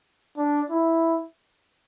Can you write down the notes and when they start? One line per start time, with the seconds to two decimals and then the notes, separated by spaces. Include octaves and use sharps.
0.38 D4
0.70 E4